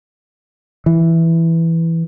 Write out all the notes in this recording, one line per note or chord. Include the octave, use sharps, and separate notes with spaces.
E3